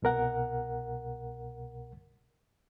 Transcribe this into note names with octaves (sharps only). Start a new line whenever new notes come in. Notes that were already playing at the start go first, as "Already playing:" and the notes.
C2 B2 A#4 F#5